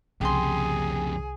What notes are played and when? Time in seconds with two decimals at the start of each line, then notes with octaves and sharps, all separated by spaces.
0.21 C2 F2 C#3 G4 G#4 C6